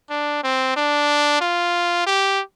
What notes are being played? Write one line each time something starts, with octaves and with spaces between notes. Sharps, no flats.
D4
C4
D4
F4
G4